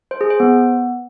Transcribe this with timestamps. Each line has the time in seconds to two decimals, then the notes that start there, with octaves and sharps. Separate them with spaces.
0.11 C5
0.21 G#4
0.30 C5
0.40 B3